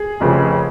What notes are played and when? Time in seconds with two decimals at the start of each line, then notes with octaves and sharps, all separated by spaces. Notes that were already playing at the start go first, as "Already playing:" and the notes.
Already playing: G#4
0.20 F1 F2 C#3 F3